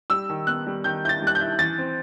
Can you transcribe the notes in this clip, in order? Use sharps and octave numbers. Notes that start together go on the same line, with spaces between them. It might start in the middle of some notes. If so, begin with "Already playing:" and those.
G3 E6
D#3
B3 F#6
G3
D#3 G6
E4 G6
A6
G3 F#6
G6
E4
E3 A6
C4